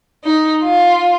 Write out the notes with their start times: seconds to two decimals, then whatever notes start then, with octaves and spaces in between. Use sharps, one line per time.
0.23 D#4
0.62 F4